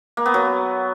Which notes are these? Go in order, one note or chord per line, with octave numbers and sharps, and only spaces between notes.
A#3
B3
F#3